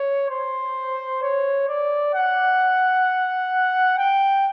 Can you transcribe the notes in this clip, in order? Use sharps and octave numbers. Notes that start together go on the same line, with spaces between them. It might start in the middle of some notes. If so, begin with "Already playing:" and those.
Already playing: C#5
C5
C#5
D5
F#5
G5